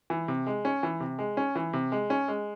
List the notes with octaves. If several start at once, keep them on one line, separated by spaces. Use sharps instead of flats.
E3
C3
G#3
C#4
E3
C3
G#3
C#4
E3
C3
G#3
C#4
G#3